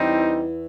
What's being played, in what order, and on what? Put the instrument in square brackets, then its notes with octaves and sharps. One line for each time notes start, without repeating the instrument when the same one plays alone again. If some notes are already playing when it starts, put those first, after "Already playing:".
Already playing: [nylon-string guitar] E2 E3 [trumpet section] G3 C4 D#4